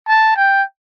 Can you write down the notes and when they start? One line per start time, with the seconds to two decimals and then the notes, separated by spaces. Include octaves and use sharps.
0.08 A5
0.37 G5